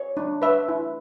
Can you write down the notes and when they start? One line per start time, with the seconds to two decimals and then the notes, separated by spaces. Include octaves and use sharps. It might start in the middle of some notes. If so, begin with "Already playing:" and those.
Already playing: C#5
0.17 D4
0.42 B4 E5
0.68 E4